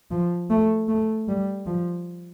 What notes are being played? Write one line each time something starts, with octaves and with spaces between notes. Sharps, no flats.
F3
A3
A3
G3
F3